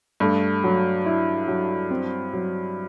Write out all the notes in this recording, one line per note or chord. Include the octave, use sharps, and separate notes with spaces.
G2 A3
F#3
E4
F#3
C4
F#3